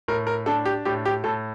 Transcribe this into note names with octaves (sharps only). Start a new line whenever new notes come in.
A2 A#4
A#4
D4 A4
G4
A2 G4
G4
A2 A4